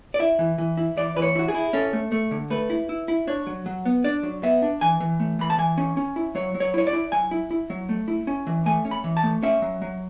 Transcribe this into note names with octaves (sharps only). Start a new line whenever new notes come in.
D5
E4 E5
E3
E3
E4
E3 D5
E3 B4
C#5
E4 F#4
G#4
E4
C#4 A4
A3
A3
D3
A3 B4
E4
E4
E4
D4 C#5
F#3
F#3
B3
D4 D5
F#3
B3 E5
D4
E3 G#5
E3
A3
E3 B5
A5
E3 G#5
C#4
C#4
E4
F#3 C#5
F#3
C#5
E4 C#5
D5
E4
F#3 G#5
E4
E4
F#3
A3
E4
C#4
E3
A3 G#5
C#4
B5
E3
A5
A3
C#4 E5
F#3
F#3